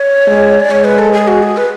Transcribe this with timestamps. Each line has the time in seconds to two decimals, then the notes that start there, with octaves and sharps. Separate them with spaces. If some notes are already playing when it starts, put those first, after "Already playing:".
Already playing: C#5
0.27 G#3
0.60 D5
0.70 G#3 C#5
0.84 B4
0.99 A4
1.13 G#4
1.28 F#4
1.43 G#4
1.57 B4